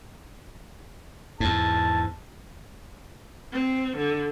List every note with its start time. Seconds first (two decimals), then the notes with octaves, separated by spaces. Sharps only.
1.40 E2 G#2 A5
3.53 C4
3.97 D3